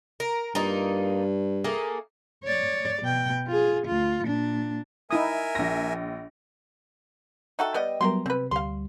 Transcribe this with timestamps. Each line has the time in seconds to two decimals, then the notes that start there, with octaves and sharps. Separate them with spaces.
0.20 A#4
0.55 G2 A#3 D#4 F4
1.64 A3 A#3 G#4
2.44 C#5 D5
3.02 B2 G5
3.47 F4 G#4
3.86 D2 F4
4.25 A#2 D4
5.11 D#4 E4 A#4 E5 G#5 D#6
5.55 A#1 A#6
7.59 D#4 F#4 A4 E5 G5
7.74 G3 B3 D#5
8.01 F#3 G3 B3 A#4 G5 C6
8.26 C3 C4 B4
8.51 D2 G3 F5 C6